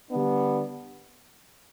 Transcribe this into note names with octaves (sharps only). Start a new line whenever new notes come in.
D3 G3 B3 D4